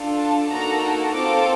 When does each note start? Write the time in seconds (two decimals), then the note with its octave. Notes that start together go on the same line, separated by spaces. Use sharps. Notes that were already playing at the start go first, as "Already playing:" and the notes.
Already playing: D4 F4 A4
0.19 A5
0.50 A#3 D#4 F#4 A4 A#5
1.14 C4 F4 A4 D6